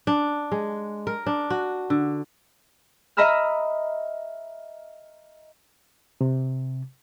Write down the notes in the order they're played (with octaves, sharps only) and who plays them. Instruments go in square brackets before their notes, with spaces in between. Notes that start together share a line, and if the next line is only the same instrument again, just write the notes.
[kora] D4
G#3
A#4
D4
F#4
D3
[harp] D#5 E5 A#5 B5 E6 F6
[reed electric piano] C3